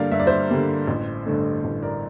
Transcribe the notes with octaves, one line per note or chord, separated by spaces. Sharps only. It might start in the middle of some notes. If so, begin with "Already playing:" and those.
Already playing: G2 D3 G3 A#3 D5 F5
G2 E5
D5
C5 E5
D3 G3 A#3
A1
G2 D3 A3
A1
A#4 D5